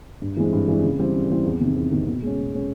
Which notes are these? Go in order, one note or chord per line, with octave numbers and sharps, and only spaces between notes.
G2
E3 G#3 C4
G2
E3 G#3 C4
C#3
E3 G3 C4
C#3
E3 G3 C4
E2
C3 D#3
E2
C3 D#3
B2
G#3 C#4
B2
G#3 C#4